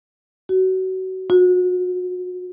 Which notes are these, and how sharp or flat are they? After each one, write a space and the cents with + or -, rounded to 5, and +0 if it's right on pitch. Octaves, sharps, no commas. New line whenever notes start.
F#4 +25
F#4 -35